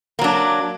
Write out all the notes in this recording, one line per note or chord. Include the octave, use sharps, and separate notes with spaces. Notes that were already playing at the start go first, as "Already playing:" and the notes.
F#3 A#3 D4